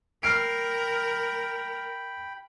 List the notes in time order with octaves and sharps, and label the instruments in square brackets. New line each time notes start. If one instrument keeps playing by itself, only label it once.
[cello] A#4 [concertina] G5 B5 [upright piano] F6 C7 D7